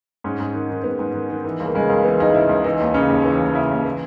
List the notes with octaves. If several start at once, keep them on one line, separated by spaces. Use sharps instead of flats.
G#2 C#4
G#2
D#3
D#3
G#2 B3
G#2
D#3
D#3
E3
C#2 A#3
C#3 G#3
C#2 A#3
E3 B3
C#2 D#4
C#3 E4
C#2
E3 D#4
D#2
C#3 C#4
D#2
E3
D#2
C#3 E4
D#2
E3